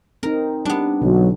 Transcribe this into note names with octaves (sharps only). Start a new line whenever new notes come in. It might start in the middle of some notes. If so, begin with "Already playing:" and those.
C4 D#4 A#4
G3 B3 D4
B1 D3 F#3